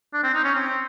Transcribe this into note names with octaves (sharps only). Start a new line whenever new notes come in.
D4
C4
D#4
C#4
C4